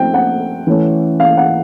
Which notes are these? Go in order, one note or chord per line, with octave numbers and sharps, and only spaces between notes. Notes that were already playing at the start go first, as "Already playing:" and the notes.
Already playing: F3 A3 C4 D#4 G5
F#5
E3 A3 C#4
F5
F#5